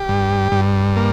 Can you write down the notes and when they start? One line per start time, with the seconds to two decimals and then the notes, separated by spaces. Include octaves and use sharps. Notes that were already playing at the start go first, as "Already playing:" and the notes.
Already playing: G4
0.09 G2
0.52 G2
0.96 A#3